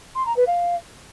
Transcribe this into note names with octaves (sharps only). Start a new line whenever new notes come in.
C6
A#5
B4
F5